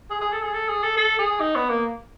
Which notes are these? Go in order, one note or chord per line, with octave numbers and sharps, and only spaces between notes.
G#4
G#4
A4
G#4
A4
G#4
A4
A4
G#4
D#4
B3
A#3